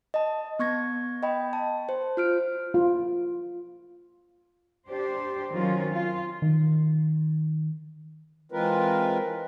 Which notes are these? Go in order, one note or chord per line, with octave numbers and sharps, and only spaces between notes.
D#5 A5
B3 C#6 G#6 A#6
D#5 G5 B5
A5
C5
F4 F6 D7
F4
D4 G4 C5
D#3 F#3 C4 C#4 F4
F4
D#3
E3 G#3 C4 F4 A#4 B4